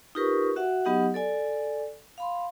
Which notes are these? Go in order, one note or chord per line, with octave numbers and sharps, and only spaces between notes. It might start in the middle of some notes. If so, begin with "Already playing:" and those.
D#4 F4 G4 A#4 B4 C#6
F#4 E5 F#5
F#3 B3 D#4 G4 D#5 F#5
A4 D5 G#5
F5 B5 C6